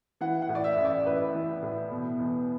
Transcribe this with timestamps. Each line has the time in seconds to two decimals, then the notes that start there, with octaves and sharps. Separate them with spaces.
0.21 E3 F#5
0.42 F#5
0.49 A2
0.55 D5
0.64 E5
0.78 A1
0.85 D5
1.06 A1 B4
1.34 E3
1.63 A2
1.91 B2
2.19 E2